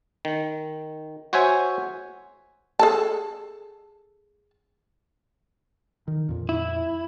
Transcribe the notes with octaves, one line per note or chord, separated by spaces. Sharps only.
D#3
F#4 C5 C#5 E5 G#5
G#4 A4 A5
D#3
F2 A#2
E4